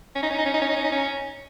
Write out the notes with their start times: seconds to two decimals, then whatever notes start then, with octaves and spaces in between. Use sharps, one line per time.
0.16 C#4
0.23 D#4
0.31 C#4
0.39 D#4
0.46 C#4
0.54 D#4
0.61 C#4
0.69 D#4
0.76 C#4
0.84 D#4
0.92 C#4